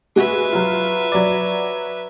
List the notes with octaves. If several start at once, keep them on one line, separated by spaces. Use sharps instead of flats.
G#3 F#4 B4 E5
F#3 F4
F#3 D5